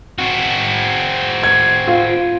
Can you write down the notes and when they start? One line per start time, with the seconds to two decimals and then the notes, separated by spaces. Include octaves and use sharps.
0.19 C4 F#4
1.43 G#6
1.88 F4